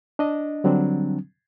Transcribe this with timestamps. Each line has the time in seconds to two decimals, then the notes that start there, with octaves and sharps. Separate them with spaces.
0.19 D4 D#5
0.64 D3 F#3 G3 C4 D4